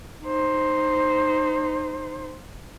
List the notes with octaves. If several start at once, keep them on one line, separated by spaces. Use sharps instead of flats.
D#4 C5